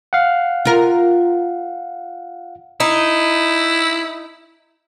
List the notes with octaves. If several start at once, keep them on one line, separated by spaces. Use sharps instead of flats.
F5 F#5
F4 A#4
D#4 E4